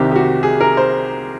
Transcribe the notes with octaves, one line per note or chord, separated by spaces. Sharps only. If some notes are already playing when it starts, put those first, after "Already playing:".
Already playing: C2 C3 D#3 G4
G4
F#4
G#4
A#4
C5